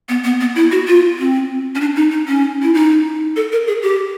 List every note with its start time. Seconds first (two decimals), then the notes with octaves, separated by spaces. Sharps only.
0.09 B3
0.24 B3
0.41 B3
0.55 E4
0.71 F#4
0.88 F4
1.19 C4
1.75 C#4
1.81 D4
1.96 D#4
2.11 D#4
2.28 C#4
2.62 E4
2.74 D#4
3.36 A4
3.52 A#4
3.67 G#4
3.82 G4